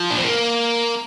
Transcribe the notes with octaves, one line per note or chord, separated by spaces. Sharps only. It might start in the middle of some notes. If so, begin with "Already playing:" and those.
Already playing: F3
D4
C4
A#3